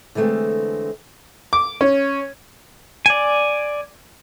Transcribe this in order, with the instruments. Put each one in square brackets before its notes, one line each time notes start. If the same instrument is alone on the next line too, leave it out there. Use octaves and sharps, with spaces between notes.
[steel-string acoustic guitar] D3 E3 G#3 A3 C4
[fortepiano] D6
C#4
[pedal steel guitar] D5 G#5